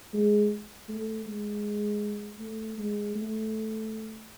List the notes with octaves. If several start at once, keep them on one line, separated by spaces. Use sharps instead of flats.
G#3
A3
G#3
A3
G#3
A3